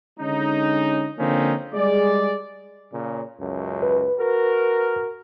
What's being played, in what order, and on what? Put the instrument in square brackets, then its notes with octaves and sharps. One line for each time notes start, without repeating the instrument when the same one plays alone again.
[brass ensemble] D3 G#3 C#4 D#4
D3 F3 A#3 C4 C#4 D#4
G3 G#3 G#4 D5
[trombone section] A#2 C#3
C#2 F#2
[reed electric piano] B4
[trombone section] F#4 A#4